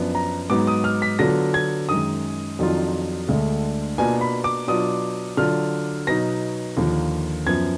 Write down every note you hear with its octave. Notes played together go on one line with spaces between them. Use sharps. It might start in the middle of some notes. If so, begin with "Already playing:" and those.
Already playing: F#2 F3 B3 D4
A#5
G#2 F#3 B3 D#4 D6
D#6
F6
B6
D3 F#3 B3 F4 A#6
G#6
F#2 D#3 G#3 D#6
F2 D#3 F#3 D4 F4
D2 D3 G#3 D4
B2 A#3 D4 F4 G#5
B5
D6
B2 F#3 D4 F4 D#6
D3 F#3 D4 F4 F6
B2 F#3 B3 D#4 A#6
D#2 D3 F3 A#3 F4
F#2 F3 B3 G#6